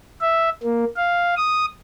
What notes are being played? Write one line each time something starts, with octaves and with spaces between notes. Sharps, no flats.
E5
A#3
F5
D#6